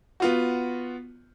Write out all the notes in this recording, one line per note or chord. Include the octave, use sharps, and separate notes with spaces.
B3 F4 F#4